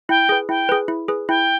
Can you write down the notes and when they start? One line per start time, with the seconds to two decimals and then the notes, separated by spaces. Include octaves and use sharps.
0.09 E4 G5
0.29 G#4 B4
0.49 E4 G5
0.69 G#4 B4
0.88 E4
1.08 G#4 B4
1.28 E4 G5